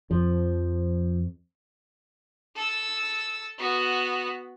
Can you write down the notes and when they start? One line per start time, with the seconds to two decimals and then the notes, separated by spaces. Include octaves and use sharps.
0.11 F2 F3
2.55 A4 E6
3.59 B3 F#4